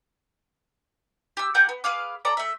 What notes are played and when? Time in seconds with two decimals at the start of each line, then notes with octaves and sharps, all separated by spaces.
1.37 G4 E6
1.55 G4 A#4 F#5 G6
1.69 B3
1.84 G#4 B4 F5 D6
2.25 A4 D5 A#5
2.37 A3 E5